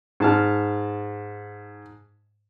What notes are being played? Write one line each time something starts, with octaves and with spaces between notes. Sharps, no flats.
G#2 A5 F6